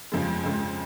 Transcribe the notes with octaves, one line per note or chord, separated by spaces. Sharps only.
F2 C#3 F3 G#3
F2 C#3 F3 G#3